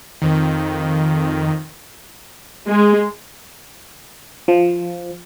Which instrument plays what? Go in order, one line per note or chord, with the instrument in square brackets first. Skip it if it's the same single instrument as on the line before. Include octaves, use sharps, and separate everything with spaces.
[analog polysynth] F2 D#3
[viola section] G#3
[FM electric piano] F3